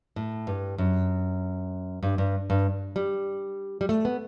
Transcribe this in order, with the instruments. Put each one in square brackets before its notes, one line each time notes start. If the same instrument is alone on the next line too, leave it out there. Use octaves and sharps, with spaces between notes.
[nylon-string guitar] A2
G2
F#2
G2
G2
G2
G3
G3
A3
B3